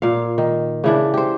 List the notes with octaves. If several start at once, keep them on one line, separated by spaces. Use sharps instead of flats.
A#2 F5
D#3
C#3 E3 D4
G4 C5